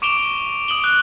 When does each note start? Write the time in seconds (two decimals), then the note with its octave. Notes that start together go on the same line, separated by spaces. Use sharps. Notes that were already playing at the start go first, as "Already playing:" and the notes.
0.02 C#6 D6 D7 E7 F7 G7
0.68 D#6 D7 F#7 G7
0.84 F#6